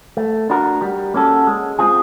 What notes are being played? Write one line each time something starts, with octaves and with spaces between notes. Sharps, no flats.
A3
D4 F#4 A#4
G3
A#3 C#4 F#4 A4
G#3
C4 F4 G#4